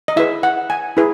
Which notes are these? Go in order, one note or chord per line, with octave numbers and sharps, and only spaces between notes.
D#5
E4 G#4 B4 E5
F#5
G#5
E4 G#4 B4